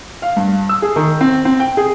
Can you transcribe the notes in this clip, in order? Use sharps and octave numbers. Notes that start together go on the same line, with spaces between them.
F5
G2
E6
G#4
D#3
C4
C4
G5
G#4